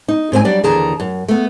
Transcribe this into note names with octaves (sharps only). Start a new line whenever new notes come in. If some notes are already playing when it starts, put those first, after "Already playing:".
D#4
G#2 C4 B4 G#5
F#3 G3 D4 D5
D#2 D3 E3 G#4 A5 A#5
F#2
A3 B3